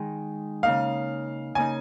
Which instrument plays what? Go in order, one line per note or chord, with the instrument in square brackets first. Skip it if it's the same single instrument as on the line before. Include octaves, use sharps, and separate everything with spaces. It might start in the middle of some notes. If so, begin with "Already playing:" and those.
Already playing: [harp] D#3 G#3 D#4
[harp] C#3 A#3 D#4 [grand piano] F5
[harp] C#3 A#3 D#4 [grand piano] G#5